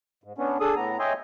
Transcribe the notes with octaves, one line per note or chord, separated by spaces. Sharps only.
G#2
B3 C#4 D4
D4 G#4 A4 D#6
A2 B3 A#5
C#5 D#5 E5 G5 G#5 C6